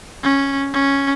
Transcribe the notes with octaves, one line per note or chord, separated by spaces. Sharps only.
C#4
C#4